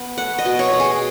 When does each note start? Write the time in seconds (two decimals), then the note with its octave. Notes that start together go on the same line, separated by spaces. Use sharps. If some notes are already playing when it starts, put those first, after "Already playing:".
Already playing: B3
0.18 A3 F#5
0.39 D#5
0.45 B2
0.59 C#5
0.73 B2
0.80 G#4